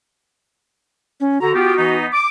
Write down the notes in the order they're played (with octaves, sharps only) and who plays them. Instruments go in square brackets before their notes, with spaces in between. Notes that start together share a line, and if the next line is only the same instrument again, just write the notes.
[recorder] C#4
[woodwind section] D3 A#5 [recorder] F#4
[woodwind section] B3 F4 G4
E3 B3 D#4
D6